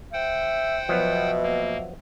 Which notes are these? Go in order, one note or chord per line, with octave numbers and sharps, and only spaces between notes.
C5 E5 F#5 G5
B2 F3 F#3 B3 E5
A#3